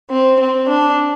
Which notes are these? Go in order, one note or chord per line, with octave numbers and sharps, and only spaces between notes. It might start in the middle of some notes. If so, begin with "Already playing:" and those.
C4
C4
D4